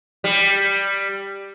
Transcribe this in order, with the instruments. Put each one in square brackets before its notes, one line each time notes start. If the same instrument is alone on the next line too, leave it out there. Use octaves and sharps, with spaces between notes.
[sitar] G3